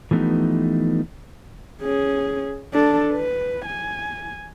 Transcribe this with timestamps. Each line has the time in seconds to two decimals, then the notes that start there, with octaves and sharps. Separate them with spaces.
0.11 E3 F3 A3 B3 D#4 G4
1.83 C#4 G#4
2.74 D4 A4
3.13 B4
3.65 G#5